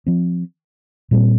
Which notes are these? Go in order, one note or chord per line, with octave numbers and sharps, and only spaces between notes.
F3 C4
A#2 G3 C4